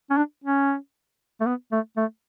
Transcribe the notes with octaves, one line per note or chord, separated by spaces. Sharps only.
C#4
D4
C#4
A3
B3
A3
A3